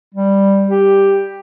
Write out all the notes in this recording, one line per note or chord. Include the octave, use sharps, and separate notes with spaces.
G3
G4